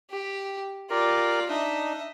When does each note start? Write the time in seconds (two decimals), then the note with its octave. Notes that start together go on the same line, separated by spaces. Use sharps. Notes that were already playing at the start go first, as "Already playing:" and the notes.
0.11 G4
0.90 F4 G4 A#4 D5
1.49 D4 D#4 D#5 E5